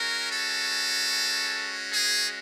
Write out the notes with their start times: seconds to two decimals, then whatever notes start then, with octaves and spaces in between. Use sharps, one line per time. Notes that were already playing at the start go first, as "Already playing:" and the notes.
Already playing: G#3 C#4 F#4 A#4
0.31 A4
1.90 G#4